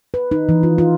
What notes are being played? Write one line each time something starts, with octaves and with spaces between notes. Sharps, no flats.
B4
D#4
E3
F4
F4